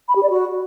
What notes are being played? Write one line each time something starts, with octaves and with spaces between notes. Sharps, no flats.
B5
G4
D5
F#4